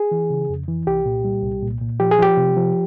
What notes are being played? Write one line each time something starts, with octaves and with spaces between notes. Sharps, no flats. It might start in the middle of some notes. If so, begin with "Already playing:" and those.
Already playing: G#4
E3
C#3
F2
E3
C2 G4
A#2
G3
C2
A#2
A#2
F3 G4
G#4
F3 G4
C3
F3